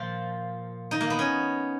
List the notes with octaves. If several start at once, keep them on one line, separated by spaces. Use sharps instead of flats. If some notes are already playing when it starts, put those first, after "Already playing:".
Already playing: A#2 F3 F4
D#4
A#3
B3
C#4